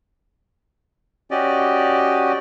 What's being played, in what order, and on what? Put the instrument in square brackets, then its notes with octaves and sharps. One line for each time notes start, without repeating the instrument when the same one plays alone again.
[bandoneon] C#4 F#4 G4 D5 D#5